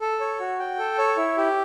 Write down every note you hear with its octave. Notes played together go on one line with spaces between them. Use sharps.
A4
C#5
F#4
G5
A4
C#5
E4
G4